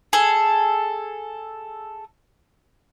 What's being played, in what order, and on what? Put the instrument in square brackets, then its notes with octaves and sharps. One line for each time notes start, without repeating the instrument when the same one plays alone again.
[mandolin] G#4 A4